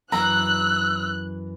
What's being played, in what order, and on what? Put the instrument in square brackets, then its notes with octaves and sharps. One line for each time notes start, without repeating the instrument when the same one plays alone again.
[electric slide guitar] F#2 E3 [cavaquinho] A#5 [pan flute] E6 [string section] F#6